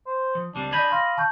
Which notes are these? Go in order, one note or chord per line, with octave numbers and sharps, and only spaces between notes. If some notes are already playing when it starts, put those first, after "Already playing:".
C5
F3
C#2 G3 C4 D4
D5 D#5 G#5 B5 G6 G#6
F5 C6 A#6
A5 C#6 G6